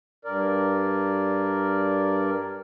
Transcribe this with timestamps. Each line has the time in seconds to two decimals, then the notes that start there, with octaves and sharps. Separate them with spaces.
0.25 G2 A#4 D5